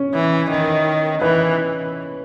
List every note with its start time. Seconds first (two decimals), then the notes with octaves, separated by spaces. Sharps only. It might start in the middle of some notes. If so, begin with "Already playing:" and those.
Already playing: C#4
0.14 E3
0.50 D#3
1.22 E3 B4